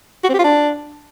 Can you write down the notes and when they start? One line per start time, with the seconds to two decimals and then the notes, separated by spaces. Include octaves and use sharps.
0.24 F#4
0.29 C4
0.34 G4
0.39 F4
0.44 D4